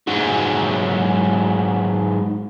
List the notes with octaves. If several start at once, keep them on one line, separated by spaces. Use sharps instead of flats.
G#2 F#3